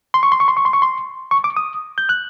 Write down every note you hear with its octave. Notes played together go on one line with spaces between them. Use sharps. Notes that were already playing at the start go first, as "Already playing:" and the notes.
C6
C#6
C6
C#6
C6
C#6
C6
C#6
C6
C#6
D6
D#6
G6
F#6